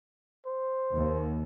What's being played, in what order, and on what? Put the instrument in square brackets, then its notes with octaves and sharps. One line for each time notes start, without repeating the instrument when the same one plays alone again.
[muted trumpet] C5
[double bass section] D#2